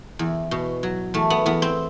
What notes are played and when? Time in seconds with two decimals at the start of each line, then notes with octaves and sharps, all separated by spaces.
0.19 E2
0.51 B2
0.83 F#3
1.14 E2 A3
1.30 B3
1.46 E2 B3
1.62 C4